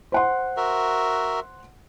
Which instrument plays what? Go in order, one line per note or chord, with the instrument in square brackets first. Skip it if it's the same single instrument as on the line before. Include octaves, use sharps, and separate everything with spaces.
[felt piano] C5 F#5 C6
[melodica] F#4 A#4 E5